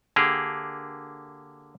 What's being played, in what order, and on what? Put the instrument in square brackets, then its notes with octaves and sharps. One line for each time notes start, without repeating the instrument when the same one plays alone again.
[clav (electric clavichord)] D3 A#3 G4 G#4